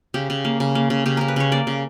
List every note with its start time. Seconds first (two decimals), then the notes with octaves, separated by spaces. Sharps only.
0.14 C#3 G4
0.30 C#3
0.45 A#3
0.60 C#3
0.75 A#3
0.90 C#3
1.06 C#3 G4
1.17 C#3 A#4
1.28 B4
1.36 C#3 C#5
1.52 A#3 D5
1.67 C#3